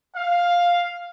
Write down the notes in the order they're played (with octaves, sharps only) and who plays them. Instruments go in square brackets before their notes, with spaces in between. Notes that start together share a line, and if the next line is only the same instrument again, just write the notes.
[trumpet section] F5